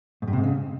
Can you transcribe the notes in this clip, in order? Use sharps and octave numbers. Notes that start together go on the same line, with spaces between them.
G#2
G2
C3
G#2
C#3